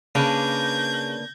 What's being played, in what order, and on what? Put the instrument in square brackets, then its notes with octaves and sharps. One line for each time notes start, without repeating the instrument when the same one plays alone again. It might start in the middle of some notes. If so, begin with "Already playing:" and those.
[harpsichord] C#3 [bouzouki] A#3 D4 B4 [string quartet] G6 G#6 A#6